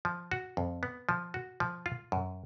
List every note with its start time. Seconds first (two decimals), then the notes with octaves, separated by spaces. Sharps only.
0.05 F3
0.31 F#4
0.57 F2
0.83 B3
1.09 F3
1.34 F#4
1.60 F3
1.86 F4
2.12 F#2